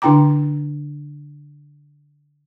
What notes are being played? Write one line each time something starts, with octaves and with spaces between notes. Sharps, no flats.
D3 D4 E4 G5 A#5 D6